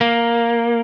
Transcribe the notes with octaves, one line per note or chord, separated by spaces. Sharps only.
A#3